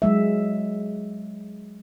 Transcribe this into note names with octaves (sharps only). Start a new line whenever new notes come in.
F#3 G#3 E5